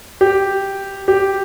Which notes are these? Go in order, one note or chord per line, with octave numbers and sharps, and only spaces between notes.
G4
G4